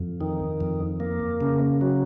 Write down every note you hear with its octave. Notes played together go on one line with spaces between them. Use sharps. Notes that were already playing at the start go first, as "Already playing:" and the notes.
Already playing: F2
D#3
F2
A#3
C#3
F#3